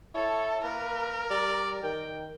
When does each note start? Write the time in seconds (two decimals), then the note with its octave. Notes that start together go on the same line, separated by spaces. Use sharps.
0.15 E4 A4 C#5
0.64 A#3 A#4 B4
1.30 G3 D5
1.83 D#3 G5